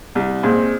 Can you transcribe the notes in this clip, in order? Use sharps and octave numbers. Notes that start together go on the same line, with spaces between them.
C2
A#2 G#3 C4